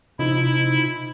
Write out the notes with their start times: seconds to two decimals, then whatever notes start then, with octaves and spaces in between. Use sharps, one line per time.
0.19 C3 F3 D#4 E4